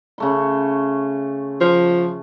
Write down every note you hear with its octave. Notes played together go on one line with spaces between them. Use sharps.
C#3 A3 C6
F3